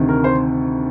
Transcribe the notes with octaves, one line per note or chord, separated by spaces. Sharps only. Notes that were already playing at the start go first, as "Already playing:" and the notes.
Already playing: D2 C3 D#3
A#4
C5